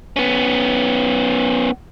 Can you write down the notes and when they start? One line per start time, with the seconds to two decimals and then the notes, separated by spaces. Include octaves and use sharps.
0.16 B3 C#4